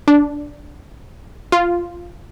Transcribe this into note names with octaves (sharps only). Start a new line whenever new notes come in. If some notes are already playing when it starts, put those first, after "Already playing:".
D4
F4